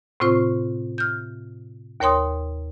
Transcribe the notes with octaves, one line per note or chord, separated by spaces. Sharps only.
A2 C3 C4 F4 C5 C#6
F6 G6
D#2 A#4 C#5 G5 C6 D#6